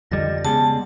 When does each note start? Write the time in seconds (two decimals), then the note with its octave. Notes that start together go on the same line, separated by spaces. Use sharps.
0.11 F2 D3 G3 D#5 A6
0.45 C#3 G3 G#3 B3 A5